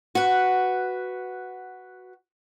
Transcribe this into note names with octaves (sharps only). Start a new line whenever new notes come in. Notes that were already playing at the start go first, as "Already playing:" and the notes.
F#4 B4